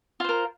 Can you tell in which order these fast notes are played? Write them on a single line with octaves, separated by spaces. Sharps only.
F4 C5 A#4